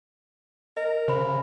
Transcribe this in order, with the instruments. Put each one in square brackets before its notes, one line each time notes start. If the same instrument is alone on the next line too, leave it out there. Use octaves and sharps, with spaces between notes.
[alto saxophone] A#4 [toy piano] D#5
[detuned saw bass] C#3 [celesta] C5 B5 [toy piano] C6